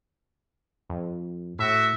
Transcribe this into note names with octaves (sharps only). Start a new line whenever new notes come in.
F2
A2 F#4 E5